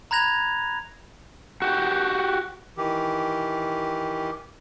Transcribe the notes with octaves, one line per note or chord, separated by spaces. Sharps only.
A#5 B5 F#6 G#6 A#6 F7
F#4 G4
D#3 E3 G4